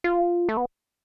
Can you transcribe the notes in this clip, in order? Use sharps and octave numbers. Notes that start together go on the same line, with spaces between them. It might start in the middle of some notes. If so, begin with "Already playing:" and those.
F4
A3
B3